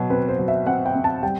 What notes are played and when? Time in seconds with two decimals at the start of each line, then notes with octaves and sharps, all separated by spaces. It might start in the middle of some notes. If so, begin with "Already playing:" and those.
Already playing: B2 F#3
0.10 C4 B4
0.29 C5
0.39 F#3
0.48 E5
0.67 C4 F#5
0.86 G5
0.95 C4
1.04 A5
1.23 G3 G5